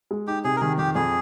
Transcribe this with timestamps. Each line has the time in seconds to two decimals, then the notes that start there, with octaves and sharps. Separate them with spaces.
0.11 G#3
0.27 D#4 G4
0.44 C3 G#4
0.56 A#4
0.61 D#3 G#4
0.78 F2 G4
0.95 F2 G#4